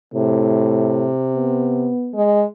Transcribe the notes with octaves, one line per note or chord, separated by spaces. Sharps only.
A2 C3
B3
G#3